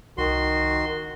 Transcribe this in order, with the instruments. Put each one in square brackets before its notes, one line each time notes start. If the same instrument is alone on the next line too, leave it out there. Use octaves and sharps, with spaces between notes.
[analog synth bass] C2 [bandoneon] D#3 F#4 C6